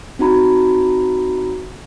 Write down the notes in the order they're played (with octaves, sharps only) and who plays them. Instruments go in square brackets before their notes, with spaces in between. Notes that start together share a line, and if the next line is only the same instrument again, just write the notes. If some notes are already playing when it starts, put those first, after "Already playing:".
[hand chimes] C4 D#4 F#4 A#5 B5